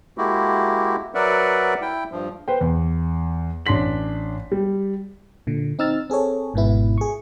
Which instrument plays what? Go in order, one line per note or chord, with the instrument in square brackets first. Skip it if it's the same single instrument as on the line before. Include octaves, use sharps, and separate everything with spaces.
[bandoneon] G#3 A#3 E4 F#4 G4
F#3 A#4 B4 D5 E5 F#5
E4 G5
G2 F3
[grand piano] B4 C5 G5
E2
A1 D4 C6 B6 F#7
G3
[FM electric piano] A#2 D3
C4 D#4 E6 F6 A6
C4 G#4 A4 C#5
G#1 G#2 B2 B3 E4
G#4 C#6